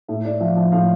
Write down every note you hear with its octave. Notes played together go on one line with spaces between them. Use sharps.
A2 E5
A2 D5
F3 E5
F3 E5
A2 F5